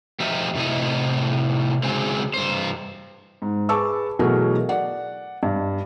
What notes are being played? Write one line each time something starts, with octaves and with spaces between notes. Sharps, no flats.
F3 A3 G4 A#4 D#5 E5
A2 C3 E4 D#5
C#3 F#3 G#3 C4
G2 C5
G#2
G#4 B4 A5 C#6 D6 E6
B2 E3 F#3 A3 G#4 A#4
D5 F#5
G2